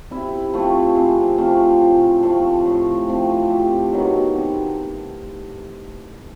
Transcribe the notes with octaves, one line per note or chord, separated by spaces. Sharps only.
C3 E4
F3 A3 C4
C3 G#4
F3 A3 C4
A2
F3 A3 C4
A2
F3 A3 C4
C3 G4
D#3 F#3 B3
C3